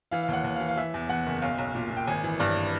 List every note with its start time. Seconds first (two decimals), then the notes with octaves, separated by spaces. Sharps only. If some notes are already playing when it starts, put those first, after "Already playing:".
0.11 E3 F5
0.23 F5
0.28 D#2 F#5
0.44 D#2
0.56 F5
0.60 E3
0.69 F5
0.77 E3 E5
0.94 E2
1.09 E2 F#5
1.26 F#1
1.42 B1 F5
1.58 B1
1.75 A#2
1.90 A#2
1.97 G5
2.07 G#1 G#5
2.24 E3
2.39 G2 D5